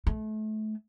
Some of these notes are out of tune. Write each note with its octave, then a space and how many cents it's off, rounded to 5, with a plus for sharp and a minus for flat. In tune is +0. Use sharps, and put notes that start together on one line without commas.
A3 -30